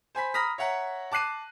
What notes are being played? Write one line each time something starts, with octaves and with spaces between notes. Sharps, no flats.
C5 G#5 B5 B6
A#5 B5 D#6 F6 A#6 B6
C#5 E5 F#5 A#5
A5 D6 F#6 C7 D#7